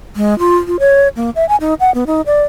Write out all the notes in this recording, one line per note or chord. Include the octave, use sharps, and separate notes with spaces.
G#3
F4
F4
C#5
A#3
E5
G#5
D#4
F#5
B3
D#4
D5